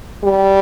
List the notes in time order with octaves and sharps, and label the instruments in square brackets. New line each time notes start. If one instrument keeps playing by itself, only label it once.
[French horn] G3